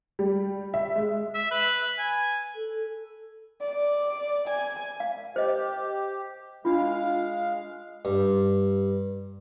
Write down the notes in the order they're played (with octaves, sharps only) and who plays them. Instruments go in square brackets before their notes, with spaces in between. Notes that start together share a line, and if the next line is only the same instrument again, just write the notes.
[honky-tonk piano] G3
E5
G#3
[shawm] E5
B4
G#5
[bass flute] A4
[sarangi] D5
G#5
[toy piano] F5
[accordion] G4 [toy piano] C5 D#5
[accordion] G#3 F5 [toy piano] D4 F4
[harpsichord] G2